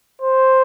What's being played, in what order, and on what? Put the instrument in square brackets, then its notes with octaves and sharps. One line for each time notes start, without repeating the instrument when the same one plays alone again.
[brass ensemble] C5